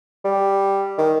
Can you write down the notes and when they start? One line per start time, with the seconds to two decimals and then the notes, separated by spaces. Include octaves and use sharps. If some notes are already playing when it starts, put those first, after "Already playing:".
0.25 G3
0.98 D#3